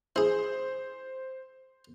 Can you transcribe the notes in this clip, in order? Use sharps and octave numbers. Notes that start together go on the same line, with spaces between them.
E4 G#4 C5